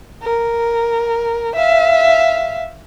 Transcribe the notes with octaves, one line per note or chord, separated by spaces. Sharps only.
A#4
E5 F5